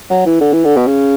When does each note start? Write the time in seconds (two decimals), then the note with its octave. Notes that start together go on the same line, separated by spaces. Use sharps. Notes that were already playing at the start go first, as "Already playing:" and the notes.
0.10 F#3
0.26 E3
0.41 D3
0.53 E3
0.65 D3
0.77 B2
0.87 C#3